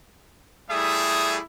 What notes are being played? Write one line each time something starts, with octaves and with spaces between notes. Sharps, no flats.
G3 A3 E4 G#4 E5 D#6